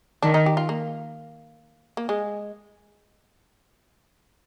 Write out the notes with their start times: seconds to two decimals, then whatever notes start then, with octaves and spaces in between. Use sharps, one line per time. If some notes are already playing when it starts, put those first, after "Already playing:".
0.23 D#3 D4
0.34 D#4
0.46 G4
0.57 F4
0.69 A#3
1.97 A#3
2.09 G#3